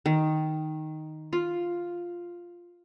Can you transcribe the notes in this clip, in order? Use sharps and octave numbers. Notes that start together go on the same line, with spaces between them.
D#3
F4